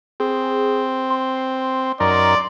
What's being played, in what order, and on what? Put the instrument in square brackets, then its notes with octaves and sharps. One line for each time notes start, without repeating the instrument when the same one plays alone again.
[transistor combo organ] C4 [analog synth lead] G#4
[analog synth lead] C6
[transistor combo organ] F#2 D#4 A#4 [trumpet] D5 [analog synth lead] C6